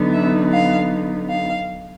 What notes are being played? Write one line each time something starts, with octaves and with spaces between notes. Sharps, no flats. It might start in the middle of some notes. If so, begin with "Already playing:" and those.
Already playing: D3 F#3 B3 D#4
E5
F5
F5